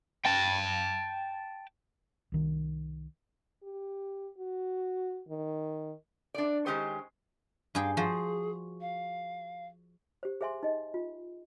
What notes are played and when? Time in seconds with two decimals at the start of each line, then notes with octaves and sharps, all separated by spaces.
0.25 G5 A5
2.32 C2 D#3
3.63 G4
4.38 F#4
5.28 D#3
6.34 D4 D5
6.66 D#3 G#3 C#4 D#4 G4 C5
7.75 G2 G#4 F5 G5
7.97 F3 F#4 G#4 C5
8.81 F5
10.23 G4 C5
10.41 G#4 C5 E5 G#5 C6
10.63 D#4 D#5
10.94 F4